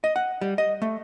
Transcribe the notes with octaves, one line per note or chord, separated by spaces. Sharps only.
D#5
F#5
G3
D#5
A3